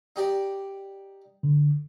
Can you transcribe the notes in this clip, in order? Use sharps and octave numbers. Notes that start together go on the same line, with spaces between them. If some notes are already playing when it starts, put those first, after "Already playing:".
D#4 G4 D5
D3